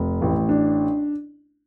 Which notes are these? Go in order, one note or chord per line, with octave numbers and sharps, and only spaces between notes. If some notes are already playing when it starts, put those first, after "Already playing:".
Already playing: F1
A1
D4